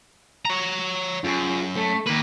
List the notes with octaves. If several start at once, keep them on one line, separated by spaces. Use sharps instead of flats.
C#5 A#5
F#2 F4 G#4
A3
D#3 A#3 B4